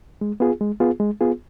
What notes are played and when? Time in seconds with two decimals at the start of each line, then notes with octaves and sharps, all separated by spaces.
0.21 G#3
0.40 B3 F4 G#4
0.61 G#3
0.80 B3 F4 G#4
1.00 G#3
1.21 B3 F4 G#4